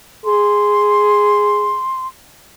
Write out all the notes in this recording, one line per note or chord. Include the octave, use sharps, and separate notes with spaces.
G#4 C6